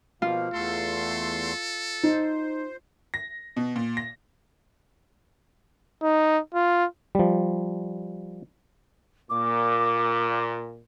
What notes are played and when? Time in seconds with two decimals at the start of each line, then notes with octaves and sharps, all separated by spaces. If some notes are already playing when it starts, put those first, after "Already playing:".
0.22 B2 F3 A#3 F4
0.54 E2 A3 A4 C6
2.03 D#4 C5
3.14 A#6
3.57 B2
3.76 A#2
3.97 A#6
6.02 D#4
6.54 F4
7.15 F3 G3
9.30 A#2 D6